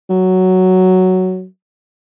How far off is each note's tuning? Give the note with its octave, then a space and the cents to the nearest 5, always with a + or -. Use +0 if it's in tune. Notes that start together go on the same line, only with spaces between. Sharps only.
F#3 +5